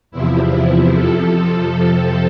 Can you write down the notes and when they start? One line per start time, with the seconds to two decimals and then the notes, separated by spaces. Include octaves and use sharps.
0.11 E2 C3 F3 E4
0.94 F2 C3 F3 A4